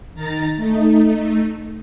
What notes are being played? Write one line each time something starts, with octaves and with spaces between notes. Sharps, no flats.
D#3 A#5 A6
A3 D#4